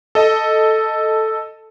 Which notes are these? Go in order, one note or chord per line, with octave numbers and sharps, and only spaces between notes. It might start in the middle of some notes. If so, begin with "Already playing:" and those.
A4 D#5